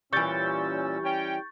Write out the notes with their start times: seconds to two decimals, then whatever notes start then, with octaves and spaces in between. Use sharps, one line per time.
0.13 A#2 E3 G3 C#4 C#6 E6 G6 A6
1.04 C#4 G5